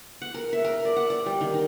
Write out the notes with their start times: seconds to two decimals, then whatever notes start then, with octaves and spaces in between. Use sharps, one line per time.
0.22 F#5
0.34 A#4
0.53 E5
0.64 A#4
0.85 D5
0.96 F#5
1.10 D5
1.26 G3
1.41 D#3
1.54 D#4